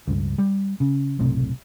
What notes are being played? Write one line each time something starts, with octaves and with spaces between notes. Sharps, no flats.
C#2 G2
G3
C#3
F#1 B1 A2 C3